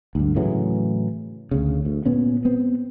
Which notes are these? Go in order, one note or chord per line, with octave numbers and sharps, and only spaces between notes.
D2 G2
A2 C#3 E3 F#3
D2 C#3
D2
A#2 B3 C#4
B3 C4